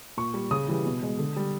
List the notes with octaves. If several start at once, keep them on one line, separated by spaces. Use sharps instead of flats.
A#2 C#6
G3
C#3 D#6
E3 G3
B2
G#3
D3
G3